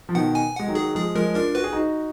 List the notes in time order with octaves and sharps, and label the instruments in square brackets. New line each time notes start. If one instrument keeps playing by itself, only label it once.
[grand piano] F3
[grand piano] B2 D#3 [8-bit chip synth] F#5
[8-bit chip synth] G#5
[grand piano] G#3 [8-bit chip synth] F#5
[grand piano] D#3 F#3
[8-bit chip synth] G#4
[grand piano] F3 G#3 [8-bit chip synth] G#4
[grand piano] F3 G#3 [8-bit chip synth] A#4
[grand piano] D4 F4 [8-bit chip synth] A#4
[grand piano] F#4 [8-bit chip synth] B4
[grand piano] G#4
D#4 F#4